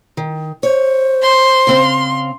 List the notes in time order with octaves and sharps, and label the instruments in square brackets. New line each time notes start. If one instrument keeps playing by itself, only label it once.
[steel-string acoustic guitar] D#3
[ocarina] C5 [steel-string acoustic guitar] C#5
[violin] C6
[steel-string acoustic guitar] C#3 C4 F5